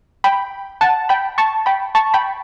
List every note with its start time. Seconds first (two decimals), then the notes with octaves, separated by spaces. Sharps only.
0.24 G5 B5
0.81 F#5 A5
1.09 G5 B5
1.38 A5 C#6
1.66 G5 B5
1.95 A5 C#6
2.14 G5 B5